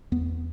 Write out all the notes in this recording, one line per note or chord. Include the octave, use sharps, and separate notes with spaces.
E2 B3